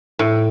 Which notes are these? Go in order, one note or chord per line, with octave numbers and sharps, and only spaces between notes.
A2